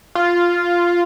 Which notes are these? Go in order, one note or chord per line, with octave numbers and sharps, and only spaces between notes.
F4